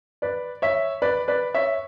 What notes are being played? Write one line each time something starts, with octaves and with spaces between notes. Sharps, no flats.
B4 D5
C#5 E5
B4 D5
B4 D5
C#5 E5